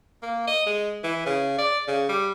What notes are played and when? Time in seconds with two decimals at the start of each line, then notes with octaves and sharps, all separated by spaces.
0.22 A#3
0.47 D#5
0.66 G#3
1.03 E3
1.26 C#3
1.58 D5
1.88 C#3
2.09 G3